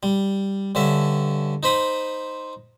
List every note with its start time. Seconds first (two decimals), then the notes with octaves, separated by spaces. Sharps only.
0.03 G3
0.75 G2 D3 C#4 E5
1.63 D#4 C5 B5 D#6